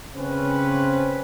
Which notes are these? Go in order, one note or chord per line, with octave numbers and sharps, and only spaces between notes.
C#3 C4 C#4 B4